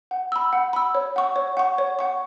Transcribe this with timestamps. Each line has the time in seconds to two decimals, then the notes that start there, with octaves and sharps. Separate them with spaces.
0.11 F#5
0.32 B5 E6
0.53 F#5
0.73 B5 E6
0.95 C#5
1.16 F#5 C#6
1.36 C#5
1.57 F#5 C#6
1.78 C#5
1.99 F#5 C#6